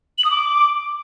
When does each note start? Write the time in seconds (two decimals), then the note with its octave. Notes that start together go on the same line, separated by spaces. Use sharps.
0.18 F#7
0.24 D#6
0.31 D6